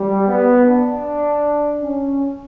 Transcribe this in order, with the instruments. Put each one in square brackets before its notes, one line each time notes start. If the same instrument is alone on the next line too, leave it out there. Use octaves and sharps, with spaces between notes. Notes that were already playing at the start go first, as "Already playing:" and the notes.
Already playing: [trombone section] G3
B3
D4
C#4